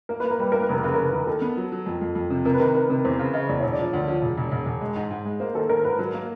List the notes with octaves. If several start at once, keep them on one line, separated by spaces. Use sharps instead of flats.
A#3 A#4
A#3 B4
A#4
G3 B4
A#3 A#4
B4
F1 A#4
C#3 B4
F1 A#4
D#2
D#3 A4
B3
F#3
F#3
F2
F2
F2
C3
C3 A#4
B4
D#3 A#4
D#3 A#4
C3 A#4
E2 C5
C#3
C#3 D#5
E2 D5
E1 C#5
D5
F3
D2
F3
E1
E1
E1
E1
G#3
G#2
G#2
G#3
A#3 C5
D#3 A4
D#3 A#4
G#2 B4
F#3 A#4
A#3